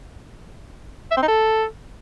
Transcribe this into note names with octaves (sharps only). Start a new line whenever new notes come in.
E5
C4
D#4
A4